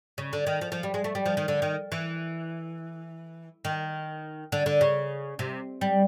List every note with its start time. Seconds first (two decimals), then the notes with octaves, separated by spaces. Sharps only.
0.18 C#3
0.33 D3
0.47 D#3
0.61 F3
0.72 F3
0.83 G3
0.94 G#3
1.04 A3
1.15 G3
1.26 F3
1.37 D#3
1.48 D3
1.62 D#3
1.92 E3
3.65 D#3
4.52 D3
4.66 D3
4.81 C#3
5.39 C3
5.81 G3